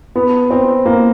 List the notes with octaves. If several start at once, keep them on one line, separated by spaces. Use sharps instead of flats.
B3
C4
A#3